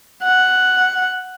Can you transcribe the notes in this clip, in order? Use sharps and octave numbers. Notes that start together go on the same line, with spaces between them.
F#5